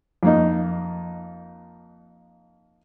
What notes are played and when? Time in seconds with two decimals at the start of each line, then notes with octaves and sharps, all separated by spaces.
0.23 F2 A#3 D#4